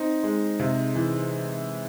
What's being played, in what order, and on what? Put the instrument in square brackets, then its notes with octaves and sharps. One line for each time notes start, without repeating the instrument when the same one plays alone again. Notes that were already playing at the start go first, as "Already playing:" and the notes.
Already playing: [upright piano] C4 [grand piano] D#4
[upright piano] G#3
C3
E3